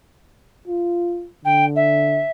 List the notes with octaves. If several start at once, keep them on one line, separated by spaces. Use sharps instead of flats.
F4
D3 G5
E5